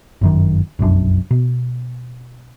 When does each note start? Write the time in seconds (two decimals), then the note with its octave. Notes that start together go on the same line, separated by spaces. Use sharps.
0.21 G1 F#2 D#3
0.79 F1 B1 F#2 D4
1.31 B2